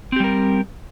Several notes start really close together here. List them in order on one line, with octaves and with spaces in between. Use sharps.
C4 G4 G3 A#4